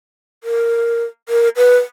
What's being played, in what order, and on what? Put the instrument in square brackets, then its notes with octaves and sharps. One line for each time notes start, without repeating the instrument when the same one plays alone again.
[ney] A#4
A#4
B4